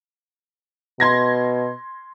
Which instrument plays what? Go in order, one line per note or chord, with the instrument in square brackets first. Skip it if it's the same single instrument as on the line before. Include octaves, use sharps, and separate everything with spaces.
[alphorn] B2 [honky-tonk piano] C6 G#6 A#6